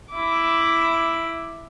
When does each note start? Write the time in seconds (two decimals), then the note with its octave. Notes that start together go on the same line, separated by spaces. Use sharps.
0.13 E4 D6